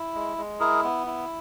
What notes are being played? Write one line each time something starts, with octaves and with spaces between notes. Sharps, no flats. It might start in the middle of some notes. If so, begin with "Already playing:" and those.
Already playing: E4
G#3
G#3
E4 G#4 A#4
B3
E4